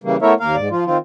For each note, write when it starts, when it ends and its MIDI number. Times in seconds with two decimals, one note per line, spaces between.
0.04 0.16 49
0.04 0.16 52
0.04 0.16 55
0.04 0.16 58
0.22 0.33 57
0.22 0.33 59
0.22 0.33 64
0.22 0.33 70
0.22 0.33 73
0.22 0.33 76
0.40 0.56 39
0.40 0.56 58
0.40 0.56 70
0.40 0.56 77
0.56 0.69 44
0.56 0.69 74
0.71 0.85 53
0.71 0.85 65
0.85 0.98 51
0.85 0.98 60
0.85 0.98 65